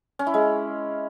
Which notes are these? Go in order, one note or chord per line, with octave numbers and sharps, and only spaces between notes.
C#4
E4
G#3